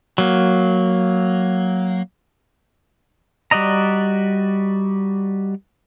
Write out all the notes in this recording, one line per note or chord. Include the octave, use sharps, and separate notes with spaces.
F#3 A#3
G3 F#4 D5 D#5 A#5